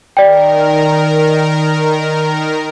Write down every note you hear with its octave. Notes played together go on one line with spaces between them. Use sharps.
D#3 A#4 D5 G5